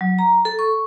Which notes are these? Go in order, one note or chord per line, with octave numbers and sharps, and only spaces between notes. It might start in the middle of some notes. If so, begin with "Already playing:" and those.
F#3
A#5
A4
C#6